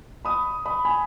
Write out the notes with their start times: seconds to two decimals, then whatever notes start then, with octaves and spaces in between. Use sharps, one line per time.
0.25 B5 D#6
0.65 B5 D#6
0.85 G#5 B5